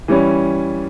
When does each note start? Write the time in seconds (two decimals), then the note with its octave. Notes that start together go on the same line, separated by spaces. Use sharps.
0.08 E3 G3 C#4